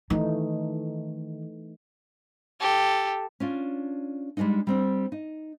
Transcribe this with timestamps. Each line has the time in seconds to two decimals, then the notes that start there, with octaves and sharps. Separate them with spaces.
0.10 D#3 E3 A3 D#4
2.60 G4 A4
3.40 C#4 D4 F4
4.37 G3 G#3 A#3 D4 D#4
4.67 G3 C4 D4
5.12 D#4